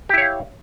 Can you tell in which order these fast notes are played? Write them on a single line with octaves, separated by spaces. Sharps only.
G4 E4 C#5 F5